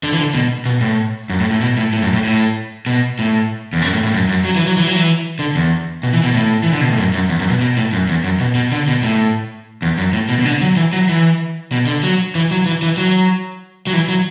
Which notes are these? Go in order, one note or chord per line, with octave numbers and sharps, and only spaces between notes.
D3
E3
D3
B2
B2
A2
F#2
A2
A2
B2
A2
A2
F#2
A2
A2
B2
A2
E2
F#2
A2
A2
F#2
F#2
F#3
E3
F#3
E3
F#3
E3
D3
E2
B2
E3
B2
A2
E3
D3
B2
A2
F#2
F#2
E2
F#2
B2
B2
A2
F#2
E2
F#2
B2
B2
D3
B2
A2
E2
F#2
A2
B2
B2
D3
F#3
E3
F#3
E3
B2
D3
F#3
E3
F#3
E3
E3
F#3
F#3
E3
F#3